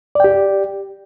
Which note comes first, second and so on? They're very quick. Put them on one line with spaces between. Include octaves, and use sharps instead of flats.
D5 G5 G4